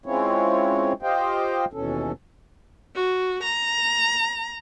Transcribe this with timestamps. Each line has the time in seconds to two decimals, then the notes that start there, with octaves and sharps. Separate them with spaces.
0.06 G#3 C4 C#4 E4 F4 C#5
1.03 F4 G4 C5 D#5 F5 G5
1.73 D#2 B2 E3 C#4 A4
2.95 F#4
3.43 A#5